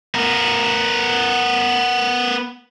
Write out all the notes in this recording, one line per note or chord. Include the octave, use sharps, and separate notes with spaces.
B3 A#4